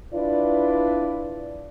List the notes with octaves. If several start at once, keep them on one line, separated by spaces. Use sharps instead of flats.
D4 E4 F4 B4 D5